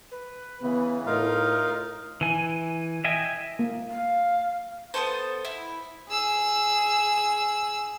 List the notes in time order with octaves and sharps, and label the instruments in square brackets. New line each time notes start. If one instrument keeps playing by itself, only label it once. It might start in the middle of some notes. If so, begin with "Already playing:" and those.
[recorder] B4
[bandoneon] C#3 E3 [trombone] B3
[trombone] A2 [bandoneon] D#4 F4 F5 [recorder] A#4
[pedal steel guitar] E3 G#5
D#5 E5 G5 G#5
[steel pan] A#3
[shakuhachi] F5
[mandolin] B3 C#4 A4 C5
E4
[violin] G#4 E6